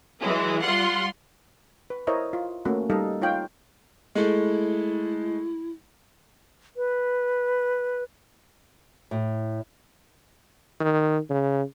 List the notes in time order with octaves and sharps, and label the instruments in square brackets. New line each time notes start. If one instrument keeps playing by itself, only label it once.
[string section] E3 F#3 G#3 E4
G3 F4 F#5 C6
[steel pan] B4
E4 A#4 C5 C#5 D#5 E5
F4
A3 A#3 C#4 F#4
G3 D#4 A4 D#5 F5
D#4 F4 C#5 F5 G5
[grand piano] G#3 A3 [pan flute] E4
[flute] B4
[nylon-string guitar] A2
[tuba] D#3
C#3